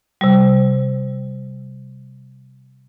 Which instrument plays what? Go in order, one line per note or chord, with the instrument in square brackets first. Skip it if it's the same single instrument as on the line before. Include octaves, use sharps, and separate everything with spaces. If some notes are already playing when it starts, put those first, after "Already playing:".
[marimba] C3 G3